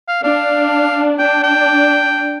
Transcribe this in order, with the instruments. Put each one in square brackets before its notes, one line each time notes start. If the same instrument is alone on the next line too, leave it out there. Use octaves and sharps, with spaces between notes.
[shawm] F5
[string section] D4 [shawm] F5
[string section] D4 [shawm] G5
[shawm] G5